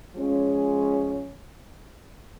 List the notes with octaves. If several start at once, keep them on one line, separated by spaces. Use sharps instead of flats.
F3 G#3 C#4